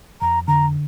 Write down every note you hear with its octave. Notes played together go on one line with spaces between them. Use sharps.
F2 A#5
D3 A#5